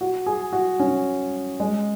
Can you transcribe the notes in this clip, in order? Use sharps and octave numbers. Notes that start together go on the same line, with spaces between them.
F#4
G#4
F#4
C#4
G#3